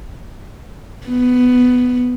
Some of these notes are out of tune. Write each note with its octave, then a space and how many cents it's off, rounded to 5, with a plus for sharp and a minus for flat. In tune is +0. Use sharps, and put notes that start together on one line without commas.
B3 +10